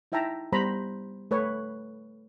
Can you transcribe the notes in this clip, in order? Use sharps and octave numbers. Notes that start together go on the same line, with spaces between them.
D#4 E4 E5 G5 A5 A#5
G3 B3 C5 A#5 B5
A3 B4 C#5